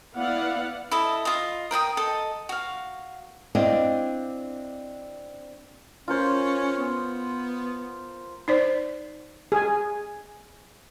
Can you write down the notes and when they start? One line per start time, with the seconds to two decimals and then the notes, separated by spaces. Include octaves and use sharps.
0.15 B3 E4 D5 F5 F#5
0.91 E4 A4 D#5
1.25 F4 D#5
1.71 A#4 G5 A5 D#6
1.97 A4 D#5
2.49 F#4 F5
3.55 C4 D4 E4 D5 D#5 F5
6.08 C#4 F4 A#4 C5
6.78 B3
8.48 D#4 C5 D5
9.52 G#4 G#5